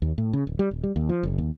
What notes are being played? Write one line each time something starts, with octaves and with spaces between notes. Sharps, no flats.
D#2
A2
C#3
D1
G3
D#1
G3
D#2
F3
F#1
D#2